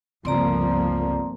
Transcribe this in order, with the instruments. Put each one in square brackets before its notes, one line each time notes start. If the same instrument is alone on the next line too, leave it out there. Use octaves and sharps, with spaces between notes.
[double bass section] G1 F3 A#3 [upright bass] C#2 [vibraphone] C4 D5 A#5